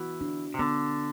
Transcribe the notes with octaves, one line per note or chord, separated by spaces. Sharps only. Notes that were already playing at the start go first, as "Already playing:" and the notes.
Already playing: E3 B3 F#4
D4
C3
D3 B3